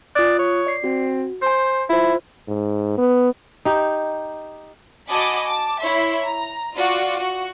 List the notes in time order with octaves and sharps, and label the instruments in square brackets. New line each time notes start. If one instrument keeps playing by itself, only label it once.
[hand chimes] F4 D#6 F#6 [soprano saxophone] D5
[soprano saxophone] C#5
[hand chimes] D5 C7
[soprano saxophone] C4 [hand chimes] F#4
[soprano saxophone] C5 [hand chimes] G#5 G6
[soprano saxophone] E4 [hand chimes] F4 C5
[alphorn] G#2
B3
[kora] D#4 G4
[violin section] F#4 D#5 G#5 A5 B5 D6
A5 D6
E4 C#5 E5 C6
A#5
F4 F#4 D5
F#4